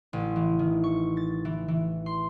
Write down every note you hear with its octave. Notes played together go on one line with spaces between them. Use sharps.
A1
E3
D#3
C#6
A6
E3
E3
C6